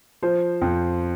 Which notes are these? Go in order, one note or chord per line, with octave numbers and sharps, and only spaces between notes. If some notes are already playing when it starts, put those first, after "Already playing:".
F3 C5
F2